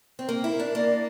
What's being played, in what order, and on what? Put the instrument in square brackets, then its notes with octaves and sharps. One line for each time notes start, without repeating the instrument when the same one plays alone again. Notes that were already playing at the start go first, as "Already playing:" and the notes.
[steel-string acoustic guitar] C4
[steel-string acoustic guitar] A#3 [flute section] A#4
[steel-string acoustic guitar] E4
[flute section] A#4
[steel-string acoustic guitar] D4
[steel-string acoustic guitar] A#3 [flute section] D5